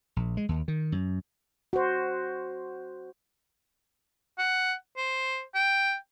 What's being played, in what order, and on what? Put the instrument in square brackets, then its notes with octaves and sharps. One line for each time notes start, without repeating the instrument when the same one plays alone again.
[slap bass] A#1
G#3
D#2
D#3
F#2
[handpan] F#4 C5
[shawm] F#5
C5
G5